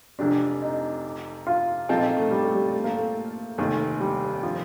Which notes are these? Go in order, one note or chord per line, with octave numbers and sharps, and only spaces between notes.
F1 F2 C3 D4
D#4
F4
A#2 F3 C4 D#4 F4 A4
D#4
A3
G3
A3
G3
A3
A#3
A3
F1 D#2 D#3 A3
G3
F3